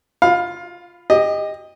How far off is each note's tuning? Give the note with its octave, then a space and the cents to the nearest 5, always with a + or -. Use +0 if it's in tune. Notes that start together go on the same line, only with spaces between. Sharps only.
F4 +0 F5 +20 B5 +20
G4 +30 D#5 +0